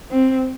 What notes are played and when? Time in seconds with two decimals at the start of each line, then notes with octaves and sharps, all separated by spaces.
0.11 C4